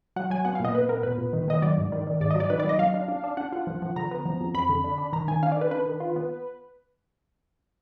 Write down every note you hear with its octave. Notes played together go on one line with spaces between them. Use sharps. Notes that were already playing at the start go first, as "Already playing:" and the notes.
F#3 F#5
F#3 G#5
B3 F#5
F5
A#2
D#5
A#2 B4
B3 A#4
A#2 B4
A#2
D#3
D#3 D#5
F#3 D5
G#2
D#3
D#3
G#2 D5
D#5
F#3 D5
D#3 B4
D5
F#3 D#5
F#3 F5
D4
D4
D4
D4 F#5
F4
F3
F3
D3 A#5
B3
F3
F2
F2 B5
D3
D4
D4
D#3 A#5
D#3 G#5
D4 F5
D5
D#3 B4
D4 B4
D#3
F4
B3